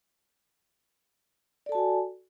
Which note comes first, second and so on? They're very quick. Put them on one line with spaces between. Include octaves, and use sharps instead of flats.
D5 A4 A5 F#4 G#5